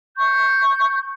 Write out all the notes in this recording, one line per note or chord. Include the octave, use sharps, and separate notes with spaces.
C#6 G6